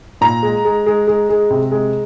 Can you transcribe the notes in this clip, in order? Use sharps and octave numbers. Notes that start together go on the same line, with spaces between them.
A#2 A#5
G#3
G#3
G#3
G#3
G#3
C3
G#3